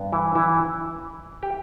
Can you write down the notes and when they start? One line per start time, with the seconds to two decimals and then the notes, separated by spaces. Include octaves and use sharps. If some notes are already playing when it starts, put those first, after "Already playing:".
Already playing: G2 B3
0.12 E3 E4
0.35 E3 E4
1.43 G4